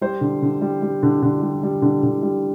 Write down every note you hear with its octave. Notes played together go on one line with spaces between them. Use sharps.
G3 C5
D3
D3
G3
G3
D3
D3
G3
G3
D3
D3
G3